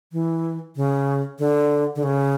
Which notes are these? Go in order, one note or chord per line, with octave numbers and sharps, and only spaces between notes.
E3
C#3
D3
D3
C#3